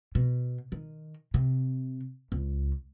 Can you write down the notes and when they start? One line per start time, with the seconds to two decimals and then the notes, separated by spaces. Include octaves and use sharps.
0.15 B2
0.72 D#3
1.34 C3
2.32 C#2